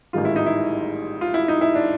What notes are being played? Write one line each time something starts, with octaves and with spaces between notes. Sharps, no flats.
A1 G#2 D#3 G3 F4
E4
D#4
E4
F4
E4
D#4
E4
D4